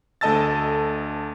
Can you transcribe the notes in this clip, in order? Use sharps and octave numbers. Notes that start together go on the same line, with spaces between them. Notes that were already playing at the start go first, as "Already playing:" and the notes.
D2 A4 D#5 A5 E6 A6